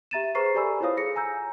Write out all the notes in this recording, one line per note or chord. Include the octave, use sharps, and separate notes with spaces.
G4 E5 A#5 A6 D#7 E7
G#4 B4 C5 A#5 C#6 C7
G4 A4 D5 G#5 B5 E6
E4 F4 C5 C#5 F5 D#6
G#4 A#6 C#7
G#5 A#5 E6 G6